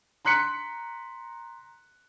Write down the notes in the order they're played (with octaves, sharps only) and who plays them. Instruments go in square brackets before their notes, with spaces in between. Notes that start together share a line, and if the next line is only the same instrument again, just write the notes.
[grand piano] A#5 C6 F#6 B6 C#7